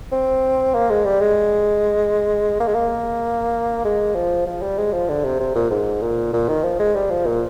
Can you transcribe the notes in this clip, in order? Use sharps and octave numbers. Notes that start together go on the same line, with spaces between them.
C4
A#3
G#3
G3
G#3
A#3
G#3
A#3
G#3
F3
F3
G3
G#3
F3
D3
C3
C3
A#2
G#2
A#2
A#2
D#3
F3
G#3
G3
F3
A#2